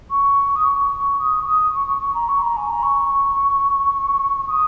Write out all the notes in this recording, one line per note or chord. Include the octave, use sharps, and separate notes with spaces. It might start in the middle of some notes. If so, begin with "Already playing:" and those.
C#6
D#6
C#6
D#6
C#6
D#6
C#6
C#6
C#6
A#5
C#6
A#5
G#5
A#5
C#6
D#6